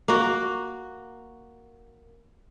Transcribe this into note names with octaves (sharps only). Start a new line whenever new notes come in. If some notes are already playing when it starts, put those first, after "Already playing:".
A#3 F#4